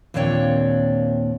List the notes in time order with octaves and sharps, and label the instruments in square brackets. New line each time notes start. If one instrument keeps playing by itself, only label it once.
[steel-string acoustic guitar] D#2 A#2 C4 D4 C#5 G5